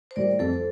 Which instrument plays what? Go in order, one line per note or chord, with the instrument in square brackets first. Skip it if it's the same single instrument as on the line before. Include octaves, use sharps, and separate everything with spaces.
[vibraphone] C5
[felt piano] A2 G3 [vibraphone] A#4 D5
[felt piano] F2 [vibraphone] A4 C5